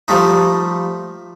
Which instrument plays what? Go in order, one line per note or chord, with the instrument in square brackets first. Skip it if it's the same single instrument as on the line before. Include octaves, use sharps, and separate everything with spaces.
[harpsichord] F3 G3 A3 D#4